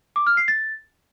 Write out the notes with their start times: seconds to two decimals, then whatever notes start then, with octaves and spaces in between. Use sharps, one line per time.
0.16 D6
0.27 F6
0.37 C7
0.48 A6